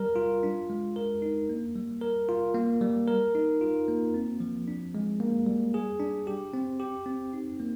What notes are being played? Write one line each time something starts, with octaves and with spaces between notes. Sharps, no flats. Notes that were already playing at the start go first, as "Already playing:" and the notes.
Already playing: G3 A#4
F4
D4
G#3
A#4
D#4
A#3
G3
A#4
F4
A#3
G3
A#4
D#4
F4
A#3
C4
F3
D4
G#3
A#3
G3
G#4
D4
G4
C4
G4
C4
D#4
A#3